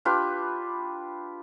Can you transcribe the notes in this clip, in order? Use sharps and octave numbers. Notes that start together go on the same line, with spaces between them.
D4 F4 G4 B4